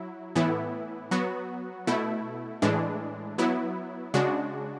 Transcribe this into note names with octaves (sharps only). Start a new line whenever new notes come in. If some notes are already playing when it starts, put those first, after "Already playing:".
Already playing: F#3 E4
A2 E3 B3 E4
F#3 B3 F#4
B2 A3 E4
A2 E3 G#3 D4
F#3 B3 E4
C#3 G#3 D4 F#4